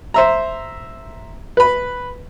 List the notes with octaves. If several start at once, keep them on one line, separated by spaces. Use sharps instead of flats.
C5 E5 A#5
B4 B5